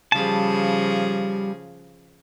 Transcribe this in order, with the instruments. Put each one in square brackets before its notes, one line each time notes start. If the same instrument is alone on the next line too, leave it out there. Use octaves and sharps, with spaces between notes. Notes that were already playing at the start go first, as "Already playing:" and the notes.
[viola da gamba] C#3 F3 G#4 [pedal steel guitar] G3 A5